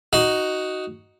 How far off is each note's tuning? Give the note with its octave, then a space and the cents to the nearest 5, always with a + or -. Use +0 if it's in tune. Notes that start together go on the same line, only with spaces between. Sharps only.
D#4 +0 F#4 +5